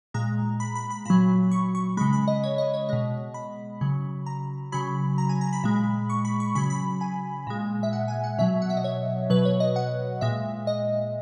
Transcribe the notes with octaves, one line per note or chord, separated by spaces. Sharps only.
A#2 G#3 A#5
B5
B5
B5
A#2 F#3 B5
C#6
C#6
C#3 G#3 B5
B5
D#5
C#5
D#5
C#5
B2 G#3 D#5
B5
C#3 F#3
A#5
C#3 F#3 B5
A#5
G#5
A#5
B5
A#2 G#3
C#6
B5
C#6
C#3 F#3 B5
B5
G#5
A#2 G#3
E5
F#5
G#5
F#5
B2 F#3 E5
F#5
E5
D#5
C#5
B2 F#3 B4
C#5
D#5
F#5
A#2 G#3 E5
D#5